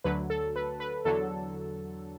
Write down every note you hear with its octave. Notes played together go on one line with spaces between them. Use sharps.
D2 D3 F#3 B4
A4
B4
B4
E2 D3 F#3 A4